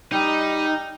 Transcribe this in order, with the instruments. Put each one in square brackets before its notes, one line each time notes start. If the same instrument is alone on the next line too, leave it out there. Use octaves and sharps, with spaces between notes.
[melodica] G3 [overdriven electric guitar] D#4